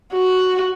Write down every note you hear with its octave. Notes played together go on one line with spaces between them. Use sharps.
F#4